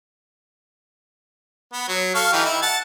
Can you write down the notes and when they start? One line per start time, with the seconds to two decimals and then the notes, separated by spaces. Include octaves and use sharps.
1.73 B3
1.89 F#3
2.15 A4 F5 C#6
2.33 E3 D#4 G4
2.45 E4
2.62 F#5 A5